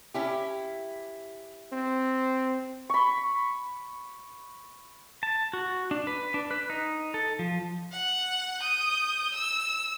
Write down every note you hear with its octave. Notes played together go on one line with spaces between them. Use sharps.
C#4 E4 G4
C4
B5 C#6
A5
F#4
D4
B4
D4
B4
D#4
A4
F3
F#5
D#6 G6
E6